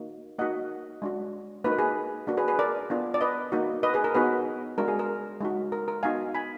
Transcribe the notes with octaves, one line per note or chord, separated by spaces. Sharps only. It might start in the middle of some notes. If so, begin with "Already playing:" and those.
Already playing: A#3 D#4 F#4
A#3 D#4 F#4 D#5 F#5
G#3 D4 F#4
A#3 D#4 F#4 B4
A#4
G#4 B4
A#3 D4 F#4
G#4 B4
G#4 B4
A#4 D5
B3 D4 F4
D5
B4 D#5
A#3 D#4 F#4
B4 D#5
G#4 B4
A#4
B3 D#4 F#4 G#4 B4
G#3 D4 F#4 A#4
G#4
A#4
G#3 D#4 F#4
A#4
A#4
B3 D#4 F#4 F5 G#5
G#5 B5